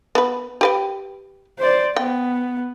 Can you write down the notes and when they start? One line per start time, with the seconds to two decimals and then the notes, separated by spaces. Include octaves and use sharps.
0.15 B3 B4
0.61 G4 B4 G5
1.59 C5 D5
1.96 B3 G5